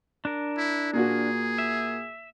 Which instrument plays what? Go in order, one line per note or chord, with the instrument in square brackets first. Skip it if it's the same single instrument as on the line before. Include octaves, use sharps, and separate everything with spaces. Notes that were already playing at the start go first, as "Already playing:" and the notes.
[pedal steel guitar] D4 A#4
[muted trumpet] E4
[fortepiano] A#2 A#3 F#4 [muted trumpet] G#4
[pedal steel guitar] E5